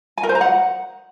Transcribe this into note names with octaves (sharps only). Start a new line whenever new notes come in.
G#5
A#4
C5
A#5
F#5